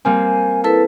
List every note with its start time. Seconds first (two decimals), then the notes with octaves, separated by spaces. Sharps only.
0.05 G3 A#3 C4 G#5
0.64 E4 A4 B4 A5